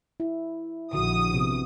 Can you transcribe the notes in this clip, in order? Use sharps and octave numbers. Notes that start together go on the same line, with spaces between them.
E4
A#1 D3 D#3 F#4 D#6
C3 B3